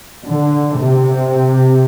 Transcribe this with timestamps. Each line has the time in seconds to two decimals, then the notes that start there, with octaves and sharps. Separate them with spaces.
0.27 D3
0.78 C3